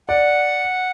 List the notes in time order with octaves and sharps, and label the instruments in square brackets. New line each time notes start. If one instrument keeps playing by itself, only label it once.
[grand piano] D5 [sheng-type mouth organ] F#5